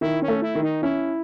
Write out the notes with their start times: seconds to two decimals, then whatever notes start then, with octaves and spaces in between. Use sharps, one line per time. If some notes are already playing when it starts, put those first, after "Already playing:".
0.01 D#3 E4
0.22 C#4
0.28 A3
0.42 E4
0.55 D#3
0.63 D#4
0.82 C#4 E4